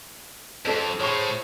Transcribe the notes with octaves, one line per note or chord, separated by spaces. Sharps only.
F2 C4 D4 A4 C5
A2 G#4 C5 C#5 E5 C#6